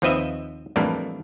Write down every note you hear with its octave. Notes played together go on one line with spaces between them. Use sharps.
D#2 F3 C4 B4 D#5 E5
F2 A2 E3 G3 A#3 D4